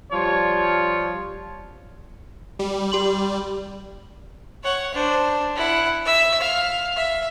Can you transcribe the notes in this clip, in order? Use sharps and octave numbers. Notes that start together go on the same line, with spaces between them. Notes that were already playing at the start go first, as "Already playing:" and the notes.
F3 G3 F4 C#5
G3
G4 C6 F#7
C#5 F#5
D4 C5
E4 F#5
E5 E6
F5
E5